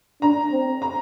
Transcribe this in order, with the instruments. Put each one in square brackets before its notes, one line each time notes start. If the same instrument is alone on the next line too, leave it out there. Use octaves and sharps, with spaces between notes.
[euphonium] D4 [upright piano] A#5
[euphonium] C4
[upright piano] A#5